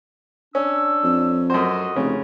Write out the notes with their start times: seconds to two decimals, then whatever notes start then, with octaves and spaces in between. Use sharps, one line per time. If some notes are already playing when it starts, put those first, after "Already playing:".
0.55 C#4 D4 E6
1.04 F2
1.50 F#2 F#4 A4 C5 D#5
1.96 F1 C#3